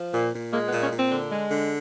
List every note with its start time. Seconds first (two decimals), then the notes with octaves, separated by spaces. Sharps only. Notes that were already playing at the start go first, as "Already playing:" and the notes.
Already playing: F3
0.13 A#2
0.33 A#2
0.52 G#3 A#3
0.67 B3
0.72 A#2
0.82 C#4
0.92 A#2 C4
1.11 D3
1.30 G#3
1.50 D3